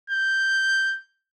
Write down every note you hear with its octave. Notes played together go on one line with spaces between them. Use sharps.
G6